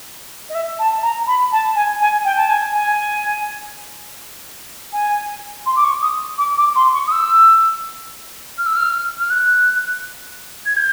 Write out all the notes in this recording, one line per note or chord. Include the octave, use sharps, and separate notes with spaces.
D#5
E5
A5
A#5
B5
A5
G#5
G#5
G5
A5
G#5
G#5
G#5
C6
D6
C#6
D#6
D6
D6
C6
C#6
D#6
E6
F6
E6
F6
F6
F#6
G#6
G6